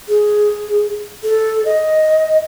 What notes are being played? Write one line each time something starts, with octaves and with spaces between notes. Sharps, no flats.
G#4
A4
D#5